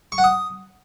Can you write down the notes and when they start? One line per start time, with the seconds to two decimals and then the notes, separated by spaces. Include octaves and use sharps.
0.12 C#6
0.18 F#5
0.24 D#6